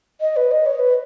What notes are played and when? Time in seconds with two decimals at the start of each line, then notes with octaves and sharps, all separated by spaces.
0.21 D#5
0.36 B4
0.51 D#5
0.66 C#5
0.79 B4